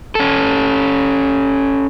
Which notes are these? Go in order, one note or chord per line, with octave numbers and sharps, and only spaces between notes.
C#4 A4